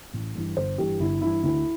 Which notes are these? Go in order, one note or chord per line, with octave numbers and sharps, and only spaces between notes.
A1
G2 E3
G1 C5
G2 E3 G4
G1 E4
G2 E3 E4
D2 E4